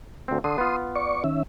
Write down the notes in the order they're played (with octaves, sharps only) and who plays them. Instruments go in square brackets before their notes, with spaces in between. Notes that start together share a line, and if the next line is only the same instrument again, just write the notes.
[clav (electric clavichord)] D2 C4
[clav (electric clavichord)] D3 [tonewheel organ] C6 D#6
[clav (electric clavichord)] B3 F4
[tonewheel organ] D5 C#6
D#3 C#4 E5